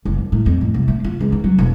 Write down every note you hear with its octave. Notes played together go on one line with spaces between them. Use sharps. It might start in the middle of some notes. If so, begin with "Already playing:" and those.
F#1
D#2
A2
F2
A2
C2
A3
F4
C#2
D#3
F#3
E1